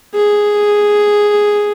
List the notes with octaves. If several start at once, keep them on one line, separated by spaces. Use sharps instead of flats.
G#4